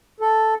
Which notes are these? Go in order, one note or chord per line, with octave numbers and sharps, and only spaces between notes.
A4